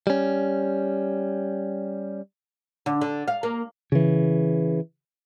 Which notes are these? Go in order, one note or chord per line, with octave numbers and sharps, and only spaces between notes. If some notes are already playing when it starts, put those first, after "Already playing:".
G3 C#4
D3
D3
F5
A#3
C#3 E3